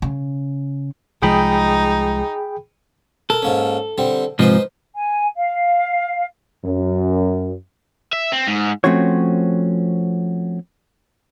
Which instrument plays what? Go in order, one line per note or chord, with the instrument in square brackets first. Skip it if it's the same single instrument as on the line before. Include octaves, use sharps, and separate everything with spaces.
[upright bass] C#3
[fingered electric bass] C2 F3 G#3 [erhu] D#4 [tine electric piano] G#4 G5 B5
[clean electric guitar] A4 [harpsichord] A#4
[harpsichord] G#2 A#3 C#4
D3 G3 C4
[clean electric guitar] G#2 C3 F3 [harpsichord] D#4 B4 C5
[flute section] G#5
F5
[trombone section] F#2
[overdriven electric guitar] E5
C4
G#2
[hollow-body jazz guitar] F3 A3 C4 C#4 F#4 C#5